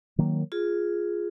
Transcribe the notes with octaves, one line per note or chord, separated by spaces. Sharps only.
D#3 F#3 A#3
F4 G#4